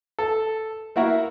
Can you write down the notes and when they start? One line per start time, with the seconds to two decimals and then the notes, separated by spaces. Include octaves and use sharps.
0.19 A4
0.96 A#3 E4 F#4 A#4